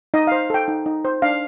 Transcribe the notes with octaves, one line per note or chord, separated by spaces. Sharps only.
D#4 D#5
F5
C5
A4 G5
D#4
D#4
C5
D4 F5